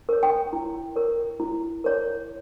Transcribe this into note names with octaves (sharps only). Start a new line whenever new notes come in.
A#4 C#5
G5
E4
A#4 C#5
E4
A#4 C#5